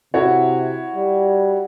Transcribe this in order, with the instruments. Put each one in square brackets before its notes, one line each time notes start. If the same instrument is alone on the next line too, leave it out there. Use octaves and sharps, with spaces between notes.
[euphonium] C3 [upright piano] E4 F#4 C#5
[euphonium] G3